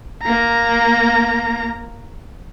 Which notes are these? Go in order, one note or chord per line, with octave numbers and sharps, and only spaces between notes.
A#3 A#5